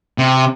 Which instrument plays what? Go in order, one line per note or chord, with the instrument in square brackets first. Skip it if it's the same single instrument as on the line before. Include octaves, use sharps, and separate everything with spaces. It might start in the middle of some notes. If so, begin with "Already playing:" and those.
[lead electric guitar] C3